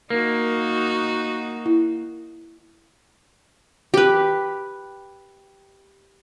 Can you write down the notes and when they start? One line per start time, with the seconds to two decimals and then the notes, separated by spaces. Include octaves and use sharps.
0.10 A#3 D#4 F#4 A#4
1.66 E4
3.94 G4 B4